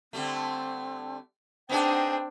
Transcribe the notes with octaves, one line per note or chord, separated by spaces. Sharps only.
D3 G3 A3 C4
B3 C4 D4 D#4 G#4 G5